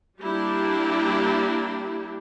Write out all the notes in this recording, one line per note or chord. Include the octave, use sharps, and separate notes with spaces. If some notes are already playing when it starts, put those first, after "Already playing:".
G3 A#3 D4 E4 G4